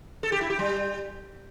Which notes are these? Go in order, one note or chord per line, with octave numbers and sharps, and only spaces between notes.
A4
G4
E4
G4
G3